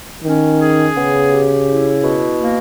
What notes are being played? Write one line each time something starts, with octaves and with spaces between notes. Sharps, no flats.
D#3 C#4
G#4
C#3 B3
G4
E4
B2
A#3